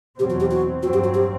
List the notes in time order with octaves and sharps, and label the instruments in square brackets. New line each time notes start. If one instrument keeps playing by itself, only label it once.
[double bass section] E2 B2 F#3 C4 [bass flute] G4
[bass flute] F#4
G4
F#4
[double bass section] G2 F#3 C4 [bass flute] F#4
[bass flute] G4
F#4
G4